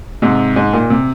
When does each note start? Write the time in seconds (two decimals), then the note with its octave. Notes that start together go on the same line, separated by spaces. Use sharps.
0.22 G#2 C3
0.56 G#2
0.73 A#2
0.90 C3